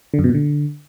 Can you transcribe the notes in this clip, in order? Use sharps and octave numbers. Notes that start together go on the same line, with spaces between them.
D3
F#2
B2
A#2
D3